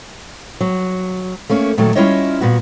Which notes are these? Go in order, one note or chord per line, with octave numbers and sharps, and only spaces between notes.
F#3
A3 A#3 C#4
A#2 D#3 F#3 A3
G3 C#4 E4 F4 C#5 D#5
A#2 B3 F#4